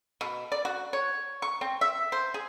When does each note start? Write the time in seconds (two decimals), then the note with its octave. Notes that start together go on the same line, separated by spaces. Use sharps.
0.21 B2
0.52 D5
0.65 F#4
0.93 C#5
1.42 C#6
1.61 C4
1.81 E5
2.12 C5
2.34 G#4